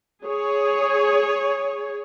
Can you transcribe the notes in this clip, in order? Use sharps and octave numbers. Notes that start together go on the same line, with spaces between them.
G#4 C#5